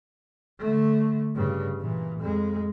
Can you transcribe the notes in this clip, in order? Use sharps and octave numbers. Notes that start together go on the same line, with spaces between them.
D3 A3
G2 C#3
A#2 E3
F2 G#3